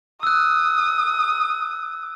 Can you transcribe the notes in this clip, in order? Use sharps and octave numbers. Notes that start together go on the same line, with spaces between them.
D#6 E6 F#6